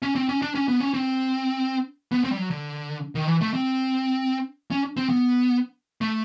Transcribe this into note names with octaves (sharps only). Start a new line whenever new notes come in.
C#4
C4
C#4
D4
C#4
B3
C#4
C4
B3
C4
G3
F#3
D3
D#3
E3
A3
C4
C#4
C4
B3
A3